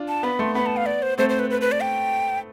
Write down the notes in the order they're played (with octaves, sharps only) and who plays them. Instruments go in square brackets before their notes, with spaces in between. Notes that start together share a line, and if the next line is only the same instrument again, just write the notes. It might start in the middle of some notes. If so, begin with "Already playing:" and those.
Already playing: [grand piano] D4 F4
[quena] A5
[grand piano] B3 [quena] B5
[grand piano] A3 [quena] C6
[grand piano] B3 [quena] B5
[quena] A5
F5
D5
C5
[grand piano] A3 C4 [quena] C5
[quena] C5
B4
B4
B4
D5
G5